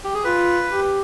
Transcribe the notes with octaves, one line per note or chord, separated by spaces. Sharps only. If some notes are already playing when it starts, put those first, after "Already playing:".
G4
G#4
F4 B4
G4